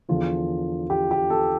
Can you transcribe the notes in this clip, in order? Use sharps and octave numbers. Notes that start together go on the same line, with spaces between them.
E2 D3 F3 F4
G4
G4
A4